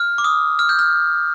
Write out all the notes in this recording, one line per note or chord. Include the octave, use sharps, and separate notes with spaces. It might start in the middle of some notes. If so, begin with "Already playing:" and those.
Already playing: F6
D6
D#6
F6
G6
F6